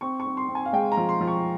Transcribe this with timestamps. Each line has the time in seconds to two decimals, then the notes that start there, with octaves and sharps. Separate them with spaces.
0.01 C4 C#6
0.20 C#6
0.26 C4
0.37 C6
0.49 C4
0.55 G#5
0.65 F5
0.73 G#3 G5
0.92 A#5
0.97 F3
1.09 C6
1.21 F3
1.27 C#6